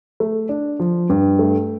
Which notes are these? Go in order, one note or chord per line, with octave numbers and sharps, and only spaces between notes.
A3
D4
F3
G2
A3